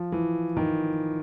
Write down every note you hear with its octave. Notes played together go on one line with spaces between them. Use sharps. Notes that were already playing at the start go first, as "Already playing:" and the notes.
Already playing: F3
E3
D#3